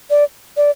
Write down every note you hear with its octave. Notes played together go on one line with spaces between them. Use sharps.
D5
D5